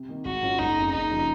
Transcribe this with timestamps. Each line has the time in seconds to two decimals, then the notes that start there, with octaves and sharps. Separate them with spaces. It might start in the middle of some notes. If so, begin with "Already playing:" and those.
Already playing: C3
0.09 D#3 A#3
0.25 G#1 F#4
0.42 G#2 F#3 C#4 F4
0.59 F#1 D#4
0.77 F2 C#3
0.93 F#1 D#4
1.11 C#3 F3